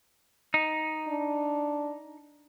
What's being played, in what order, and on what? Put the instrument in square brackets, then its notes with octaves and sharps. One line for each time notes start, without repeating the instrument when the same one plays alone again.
[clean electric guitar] D#4
[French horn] D4